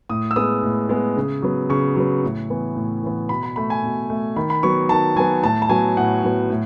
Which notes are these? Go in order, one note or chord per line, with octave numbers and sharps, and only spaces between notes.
A2 D#6
E6
G#3 B3 D#6
A2
G#3 B3
C#3
F#3 B3
C#3 C#6
F#3 B3
A2
E3 B3
A2
E3 B3
B2 B5
B5
A3 B5
G#5
B2
A3
D#3 B5
B5
F#3 B3 C#6
D#3 A5
F#3 B3 G#5
A2 A5
A5
F#3 B3 G#5
A2 F#5
F#3 B3
A2